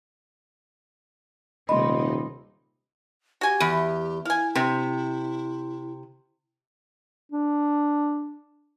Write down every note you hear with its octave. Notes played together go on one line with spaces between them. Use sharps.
D#1 C3 G#3 D#4 D#5 B5 C6
F#4 G4 G#5
E2
E4 F5 G#5
C3 C4
D4